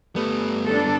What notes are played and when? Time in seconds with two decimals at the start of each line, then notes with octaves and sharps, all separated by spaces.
0.16 G2 G3 A3 B3
0.67 D4 A4